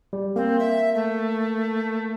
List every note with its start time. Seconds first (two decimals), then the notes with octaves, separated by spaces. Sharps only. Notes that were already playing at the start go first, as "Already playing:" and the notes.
0.13 G3
0.36 A#3 C4
0.59 E5
0.94 A3